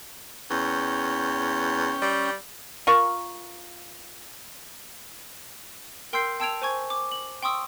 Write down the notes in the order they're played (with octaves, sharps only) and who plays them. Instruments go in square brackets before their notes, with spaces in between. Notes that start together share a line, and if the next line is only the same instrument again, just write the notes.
[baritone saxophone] E2 [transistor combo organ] C#4 G5
[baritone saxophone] G3
[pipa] F4 A#4 C#6
[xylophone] A#4 G5 C6 E6 G6 C7
G5 A5 E6 G#6 D7 F7
C5 G#5 C#6 G#6
D6
F#7
G5 C6 C#6 D#6 E6